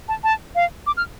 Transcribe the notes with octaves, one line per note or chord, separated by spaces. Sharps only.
A5
A5
F5
D6
F6